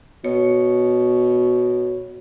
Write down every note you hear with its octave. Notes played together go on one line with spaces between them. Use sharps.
B2 C#5